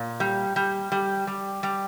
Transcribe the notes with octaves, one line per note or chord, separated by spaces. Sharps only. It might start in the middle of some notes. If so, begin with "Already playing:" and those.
Already playing: A#2
G3
G3
G3
G3
G3